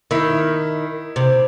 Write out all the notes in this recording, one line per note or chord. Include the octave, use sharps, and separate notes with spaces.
D#3 E4
C3